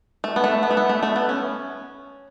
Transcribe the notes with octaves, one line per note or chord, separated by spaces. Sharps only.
A3
B3
A3
B3
A3
B3
A3
A3
B3
C#4